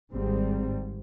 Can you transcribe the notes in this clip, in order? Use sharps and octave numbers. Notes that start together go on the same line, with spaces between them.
G#1 G#2 G3 C4